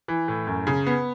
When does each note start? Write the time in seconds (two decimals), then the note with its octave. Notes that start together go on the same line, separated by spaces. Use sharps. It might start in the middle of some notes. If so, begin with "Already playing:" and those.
0.08 E3
0.28 A2
0.47 F#2
0.67 C#3
0.87 B3